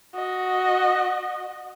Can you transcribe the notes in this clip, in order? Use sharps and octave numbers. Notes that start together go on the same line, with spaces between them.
F#4 D#5